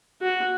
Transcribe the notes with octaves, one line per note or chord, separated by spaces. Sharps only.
F#4